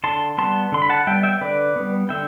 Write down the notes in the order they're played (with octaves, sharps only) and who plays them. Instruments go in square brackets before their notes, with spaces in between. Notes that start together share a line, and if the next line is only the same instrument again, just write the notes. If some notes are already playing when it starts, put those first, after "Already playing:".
[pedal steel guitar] D3 A5 C6
G3 B3 A5 C6
D3 C6
B5
F#5 A5
G3 B3 E5 G5
E5 G5
D3 B4 D5
G3 B3
D3 E5 G5